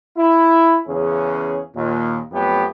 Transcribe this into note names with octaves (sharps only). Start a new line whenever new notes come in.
E4
E2 C#3 C#4 G#4
D#2 A#2
F2 F#3 A3 B3 G4